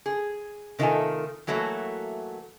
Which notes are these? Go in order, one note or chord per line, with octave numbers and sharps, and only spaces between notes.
G#4
C3 D#3 A3 F4 A4 G#5
E3 F#3 A3 A#3 F#4